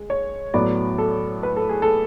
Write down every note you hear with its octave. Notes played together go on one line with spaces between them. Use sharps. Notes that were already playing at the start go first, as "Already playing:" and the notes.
Already playing: G#3
C#5
A2 F#3 B3 D5
A4
B4
A4
G#4
A4